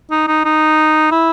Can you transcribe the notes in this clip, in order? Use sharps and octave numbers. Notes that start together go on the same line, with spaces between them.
D#4
D#4
D#4
E4